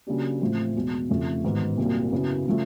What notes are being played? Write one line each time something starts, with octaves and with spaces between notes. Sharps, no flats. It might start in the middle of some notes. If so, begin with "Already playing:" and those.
C#3 F#3 A#3 D4 G4
A1 A2 F3 A3 C4
E2 B2 G#3
F1 F2 C#3 F3 A3
A1 G#2 D#3 F#3 B3
C2 A#2 F#3 A#3
F#2 C#3 F#3 B3 E4
C#3 F3 A3